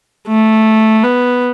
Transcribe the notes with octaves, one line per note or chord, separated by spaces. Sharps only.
A3
B3